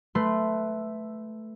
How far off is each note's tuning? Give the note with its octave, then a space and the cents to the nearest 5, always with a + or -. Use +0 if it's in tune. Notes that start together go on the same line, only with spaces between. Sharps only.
A3 +0 B4 +5 C6 +0